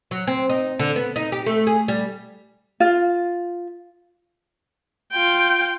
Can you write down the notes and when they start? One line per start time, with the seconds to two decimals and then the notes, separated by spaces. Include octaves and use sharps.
0.11 F#3
0.27 C4
0.49 D#4
0.79 D3
0.96 B3
1.16 D#4
1.32 G4
1.46 A3
1.67 G#4
1.88 G3
2.80 F4
5.12 F4 G5